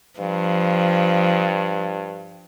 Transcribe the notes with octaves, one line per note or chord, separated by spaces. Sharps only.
G2 F3